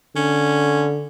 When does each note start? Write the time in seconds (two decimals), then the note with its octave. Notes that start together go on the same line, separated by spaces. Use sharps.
0.16 D3 C#4